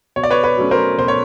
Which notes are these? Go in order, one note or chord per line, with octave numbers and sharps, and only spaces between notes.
B2 C#5
D5
B4 C#5
B4 C#5
F#3 A3 C#4
A#4 C5
B2 C5
C#5